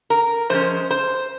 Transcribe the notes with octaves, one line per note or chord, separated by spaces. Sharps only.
A#4
F3 G#3 C#4 C5
C5